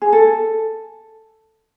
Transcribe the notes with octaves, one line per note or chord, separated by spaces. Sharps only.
G#4
A4